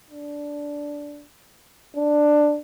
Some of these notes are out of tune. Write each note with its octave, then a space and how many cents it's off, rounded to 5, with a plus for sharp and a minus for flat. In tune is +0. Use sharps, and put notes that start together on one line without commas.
D4 -10
D4 +10